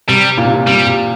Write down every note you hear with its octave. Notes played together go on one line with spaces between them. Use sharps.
C3 G3
A#2
C3
A#2
C3 G3
C3